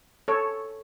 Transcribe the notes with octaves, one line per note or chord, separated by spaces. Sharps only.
A4 C#5